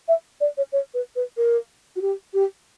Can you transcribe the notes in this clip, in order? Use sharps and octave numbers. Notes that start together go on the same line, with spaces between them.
E5
D5
C#5
C#5
B4
B4
A#4
F#4
G4
G4